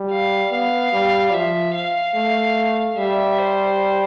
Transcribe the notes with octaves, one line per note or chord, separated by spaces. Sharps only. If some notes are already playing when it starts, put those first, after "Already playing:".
Already playing: G3
F5
B3 F5
G3
F3 E5
F5
A3
G3 E5
C5